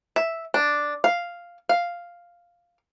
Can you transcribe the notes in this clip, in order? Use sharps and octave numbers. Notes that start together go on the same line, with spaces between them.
E5
D4
F5
F5